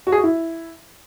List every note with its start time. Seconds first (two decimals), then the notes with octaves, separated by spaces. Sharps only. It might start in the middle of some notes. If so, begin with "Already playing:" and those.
0.07 F#4
0.12 G#4
0.18 F#4
0.24 E4